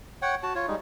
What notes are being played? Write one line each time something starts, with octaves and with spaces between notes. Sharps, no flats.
C#5 F#5 G5
F#4 A5
F4 C#5
G3 G#3 D#4